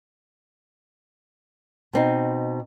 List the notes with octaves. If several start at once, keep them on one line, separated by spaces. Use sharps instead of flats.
B2 C4 D#4